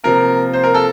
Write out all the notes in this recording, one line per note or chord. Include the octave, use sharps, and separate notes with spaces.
C3 F3 A#3 A#4
C5
A#4
A4